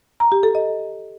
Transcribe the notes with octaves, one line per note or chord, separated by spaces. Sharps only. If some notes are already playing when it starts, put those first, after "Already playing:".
A#5
G4
A4
D#5